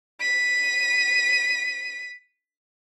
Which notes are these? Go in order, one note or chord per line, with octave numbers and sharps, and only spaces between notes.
B6 D#7